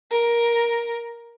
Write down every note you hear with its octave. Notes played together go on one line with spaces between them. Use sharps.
A#4